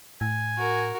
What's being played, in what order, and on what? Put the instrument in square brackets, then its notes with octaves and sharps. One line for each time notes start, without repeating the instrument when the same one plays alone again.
[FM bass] A2 [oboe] G#5
[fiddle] F#4 A#4